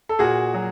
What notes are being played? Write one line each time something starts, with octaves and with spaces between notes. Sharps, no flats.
A4
A#2 F#4 G#4
F#3